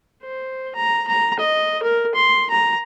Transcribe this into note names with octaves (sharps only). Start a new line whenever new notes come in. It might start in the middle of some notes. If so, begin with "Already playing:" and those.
C5
A#5
A#5
D#5
A#4
C6
A#5